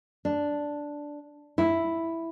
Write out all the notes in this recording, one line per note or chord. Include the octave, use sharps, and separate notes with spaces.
D4
E4